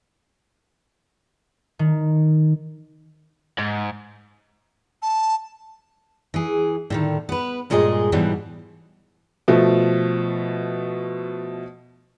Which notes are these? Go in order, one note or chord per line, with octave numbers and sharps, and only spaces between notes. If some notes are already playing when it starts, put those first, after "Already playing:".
D#3
G#2
A5
E3 G#4
A2 D3 D#3
B3 B4
G2 A#2 G#3 G#4 A#4 D#5
G#2 B2 E3 F#3 G3
B2 F3 A3